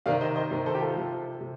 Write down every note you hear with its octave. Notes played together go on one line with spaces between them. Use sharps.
C3 D#3 D5 F5
C5 D#5
C5 D#5
C3 D#3
A4 C5
G4
F4 A4
C3 F3
C3